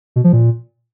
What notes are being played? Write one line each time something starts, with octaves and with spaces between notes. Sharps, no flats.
B2
F3
A#2